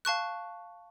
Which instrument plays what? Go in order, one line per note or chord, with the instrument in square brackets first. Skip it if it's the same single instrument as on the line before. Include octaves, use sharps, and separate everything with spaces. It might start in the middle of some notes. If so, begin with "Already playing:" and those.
[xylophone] F5 A5 C#6 F#6